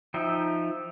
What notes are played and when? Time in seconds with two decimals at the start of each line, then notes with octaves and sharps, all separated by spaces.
0.14 F3 D#4 E5 G5